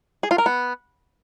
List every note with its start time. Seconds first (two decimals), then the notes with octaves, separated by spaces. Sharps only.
0.23 G#4
0.31 F4
0.38 A#4
0.46 B3